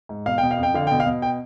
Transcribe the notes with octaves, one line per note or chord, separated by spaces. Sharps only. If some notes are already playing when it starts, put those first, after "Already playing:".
G#2
B2 F5
B2 G5
F5
F2
G5
D3 F5
B2 G5
F5
B2
G5